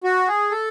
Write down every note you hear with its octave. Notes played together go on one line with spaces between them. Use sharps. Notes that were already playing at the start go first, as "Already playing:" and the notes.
F#4
G#4
A4